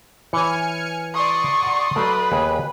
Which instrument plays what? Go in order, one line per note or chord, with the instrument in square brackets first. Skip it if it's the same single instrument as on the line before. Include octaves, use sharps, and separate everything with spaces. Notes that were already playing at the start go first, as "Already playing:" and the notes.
[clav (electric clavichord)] E3 C#5 [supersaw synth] G#5 F6 C#7
[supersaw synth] D5 C6 D#6 [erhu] C#6
[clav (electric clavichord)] F#5 A#5
[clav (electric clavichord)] F#3 A3 [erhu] B4
[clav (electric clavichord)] D#2 G#4